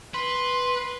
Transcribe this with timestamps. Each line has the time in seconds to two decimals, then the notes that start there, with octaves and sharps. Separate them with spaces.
0.14 B4 C6